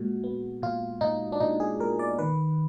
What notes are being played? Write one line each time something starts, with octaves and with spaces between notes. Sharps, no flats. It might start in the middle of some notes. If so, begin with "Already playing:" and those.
Already playing: A#2 G#3 F#4
B3
A#2 F4
A#2 D#4
D4
A#2 D#4
G#4
A#2 A#4
D5
D#3 B4